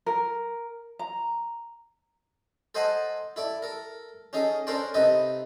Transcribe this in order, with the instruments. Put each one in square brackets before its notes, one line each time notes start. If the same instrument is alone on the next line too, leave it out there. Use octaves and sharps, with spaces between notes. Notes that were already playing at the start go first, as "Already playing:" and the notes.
[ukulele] A#4
A#5
[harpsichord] A4 C5 D#5 F#5 G#5 A5
E4 A4 D5
A4 A#4
C#4 D#4 G#4 A4
C#4 D4 A4 A#4 C5 D5
C3 D#4 A4 B4 D#5